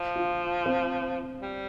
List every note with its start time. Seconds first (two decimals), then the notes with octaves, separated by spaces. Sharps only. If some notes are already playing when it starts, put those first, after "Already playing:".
Already playing: F3
0.16 F4
0.66 C4
1.42 G3